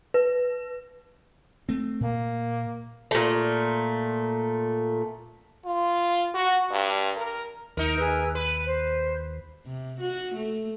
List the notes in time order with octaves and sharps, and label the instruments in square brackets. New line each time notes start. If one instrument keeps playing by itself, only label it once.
[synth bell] B4
[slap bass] A3 C4
[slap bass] A#2 [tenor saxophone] A#3
[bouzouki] A#2 A3
[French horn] F4
F#4
G2
A#4
[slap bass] D#2 [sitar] D#4 A#4
[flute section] G#4 B4 E6
[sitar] B4 [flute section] B5
[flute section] C5
[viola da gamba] C3
F#4
A3